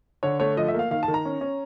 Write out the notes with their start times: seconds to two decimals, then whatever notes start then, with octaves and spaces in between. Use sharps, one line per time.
0.23 D3 C#5
0.40 A3 C#5
0.57 F3 D#5
0.68 E5
0.74 A#3 F5
0.91 D#3 F5
1.03 A5
1.08 D#3
1.14 A#5
1.25 C#4
1.41 C#4